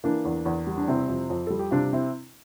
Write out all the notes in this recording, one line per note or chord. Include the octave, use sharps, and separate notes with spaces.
E3 A#3 D4
E2
E2
G3
D4
C3 C4 E4
F2
F2
G3 A4
G4
C3 D4 F4
C4 E4